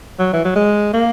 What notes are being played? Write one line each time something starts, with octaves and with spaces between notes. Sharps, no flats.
F#3
E3
F#3
G#3
A#3